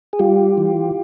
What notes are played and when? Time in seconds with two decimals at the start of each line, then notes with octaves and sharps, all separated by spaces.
0.13 G#4
0.19 G3 F4 G4
0.58 E3